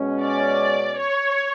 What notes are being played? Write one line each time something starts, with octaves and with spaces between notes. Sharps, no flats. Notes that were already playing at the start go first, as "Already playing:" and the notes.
Already playing: B2 G#3 C#4
D5
C#5